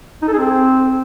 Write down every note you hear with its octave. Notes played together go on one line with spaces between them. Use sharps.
D#4
A4
G#4
C4